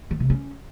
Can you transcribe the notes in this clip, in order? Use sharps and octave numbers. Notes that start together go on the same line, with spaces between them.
D#3
C3
C#4